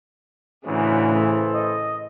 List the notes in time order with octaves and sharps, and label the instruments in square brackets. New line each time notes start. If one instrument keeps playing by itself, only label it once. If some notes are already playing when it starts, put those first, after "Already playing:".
[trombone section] D2 C#4 [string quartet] A2 C#3 E3
[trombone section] A4 B4 C5
[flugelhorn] D#5